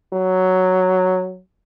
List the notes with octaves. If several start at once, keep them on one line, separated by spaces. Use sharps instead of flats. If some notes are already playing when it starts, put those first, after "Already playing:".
F#3